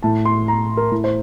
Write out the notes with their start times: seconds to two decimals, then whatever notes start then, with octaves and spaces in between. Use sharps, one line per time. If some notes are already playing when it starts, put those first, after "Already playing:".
0.03 A2 A5
0.25 C6
0.48 A#5
0.77 A#4
0.91 A2
1.04 C5